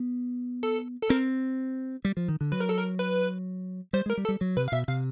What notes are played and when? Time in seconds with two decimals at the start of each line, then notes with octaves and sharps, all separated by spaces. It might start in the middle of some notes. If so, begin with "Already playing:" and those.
Already playing: B3
0.63 A4
1.02 A4
1.10 C4 A#4
2.05 G3
2.17 F3
2.28 D#3
2.41 D3
2.52 F#3 B4
2.60 A#4
2.69 A4
2.78 A#4
2.99 B4
3.93 G3 C5
4.06 G#3 A#4
4.17 G3
4.25 A4
4.29 G3
4.41 F#3
4.57 C3 B4
4.68 F5
4.72 B2 E5
4.88 C3 F5